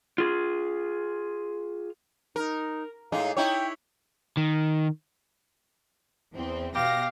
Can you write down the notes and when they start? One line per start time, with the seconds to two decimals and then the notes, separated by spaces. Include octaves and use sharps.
0.18 F4 G#4
2.36 D#4 A#4
3.12 A2 G#3 D#4 F5
3.37 D#4 E4 C#5 G5
4.37 D#3
6.34 E2 C4
6.75 B2 G4 F5 A#6